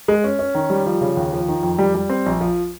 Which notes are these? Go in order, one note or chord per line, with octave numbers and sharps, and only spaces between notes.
G#3
C#4
C#4
D#3
G3
F3
C#3
D#2
F3
D#3
F2
G3
G3
C4
A#1
F3